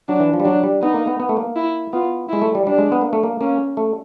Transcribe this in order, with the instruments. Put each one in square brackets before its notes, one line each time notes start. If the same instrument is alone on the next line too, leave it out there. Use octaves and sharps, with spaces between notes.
[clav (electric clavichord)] F#3 [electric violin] D4
[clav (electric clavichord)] E3
F3
G3
[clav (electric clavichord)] F#3 [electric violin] D4
[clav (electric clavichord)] G3
[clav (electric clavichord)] B3 [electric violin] D#4
[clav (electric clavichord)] A#3
B3
B3
A3
A#3
[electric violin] E4
[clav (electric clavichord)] B3 [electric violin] F4
[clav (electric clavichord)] G#3 [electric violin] E4
[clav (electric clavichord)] A3
G3
[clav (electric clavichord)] G3 [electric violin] D4
[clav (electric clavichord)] G#3
B3
A#3
A3
A#3
[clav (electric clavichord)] A#3 [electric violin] C#4
[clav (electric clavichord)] A3